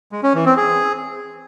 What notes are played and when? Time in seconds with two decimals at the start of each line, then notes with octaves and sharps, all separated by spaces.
0.12 G#3
0.23 C#4
0.34 E3
0.46 C4
0.57 G#4